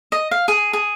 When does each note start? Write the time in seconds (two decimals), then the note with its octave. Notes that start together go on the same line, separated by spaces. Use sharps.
0.12 D#5
0.31 F5
0.48 G#4
0.73 G#4